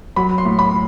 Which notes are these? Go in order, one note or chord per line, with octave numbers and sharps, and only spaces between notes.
F#3 B5
C6
A2
B5